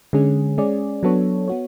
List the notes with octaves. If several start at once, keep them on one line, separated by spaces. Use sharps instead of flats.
D3 G#3 C#4 G#4
G#3 C#4 G#4 D5
F#3 B3 D4 A4 C#5
B3 F#4 C#5